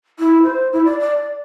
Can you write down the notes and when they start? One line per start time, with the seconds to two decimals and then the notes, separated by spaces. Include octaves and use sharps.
0.19 E4
0.43 C5
0.73 E4
0.85 D5
1.00 D5